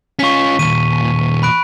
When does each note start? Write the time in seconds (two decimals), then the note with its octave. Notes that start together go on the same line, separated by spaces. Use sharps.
0.19 C#4 F4 C#6 B6
0.59 D#2 A#2 D#7
1.43 B5 F#6 D7